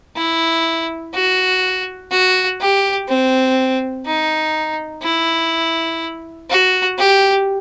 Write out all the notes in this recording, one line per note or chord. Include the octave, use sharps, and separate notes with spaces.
E4
F#4
F#4
G4
C4
D#4
E4
F#4
G4